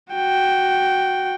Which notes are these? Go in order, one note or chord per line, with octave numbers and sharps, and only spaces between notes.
F#4 G5